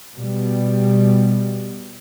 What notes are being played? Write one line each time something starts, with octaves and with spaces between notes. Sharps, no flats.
B2 G3